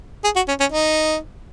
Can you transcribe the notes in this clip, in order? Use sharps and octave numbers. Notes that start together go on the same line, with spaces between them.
G#4
F#4
C#4
C#4
D#4